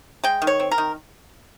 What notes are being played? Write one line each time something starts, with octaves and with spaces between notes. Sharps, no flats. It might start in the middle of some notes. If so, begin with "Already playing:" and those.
G#3 G5
D#3
C#5
C4
A#4
D#3